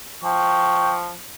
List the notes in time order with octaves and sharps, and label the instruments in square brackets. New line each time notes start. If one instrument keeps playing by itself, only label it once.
[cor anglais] F3 [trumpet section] G5 C#6